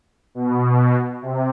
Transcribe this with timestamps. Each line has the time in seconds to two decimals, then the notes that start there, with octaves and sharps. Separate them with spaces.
0.35 B2
1.22 C3